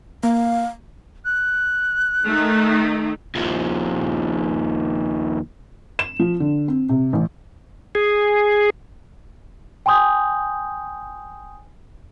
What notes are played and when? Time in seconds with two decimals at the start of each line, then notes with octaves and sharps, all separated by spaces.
0.23 A#3 F5
1.25 F#6
2.27 D#3 A3 D#4
3.35 D#2 F3
5.99 E7
6.19 F3
6.40 D3
6.68 C4
6.89 C3
7.13 A1
7.95 G#4
9.86 G5 G#5 C6 D#6 G6